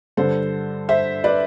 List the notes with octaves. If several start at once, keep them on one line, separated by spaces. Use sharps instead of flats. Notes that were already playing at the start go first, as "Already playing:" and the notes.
G2 D3 A4 C5
C5 E5
B4 D5